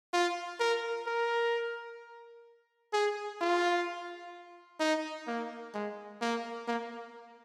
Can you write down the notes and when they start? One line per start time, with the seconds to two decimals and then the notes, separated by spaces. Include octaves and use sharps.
0.13 F4
0.60 A#4
1.07 A#4
2.93 G#4
3.41 F4
4.80 D#4
5.27 A#3
5.74 G#3
6.21 A#3
6.68 A#3